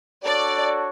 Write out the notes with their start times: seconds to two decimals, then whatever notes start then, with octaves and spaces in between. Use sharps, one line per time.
0.24 D4 F#4 A4 C#5 D5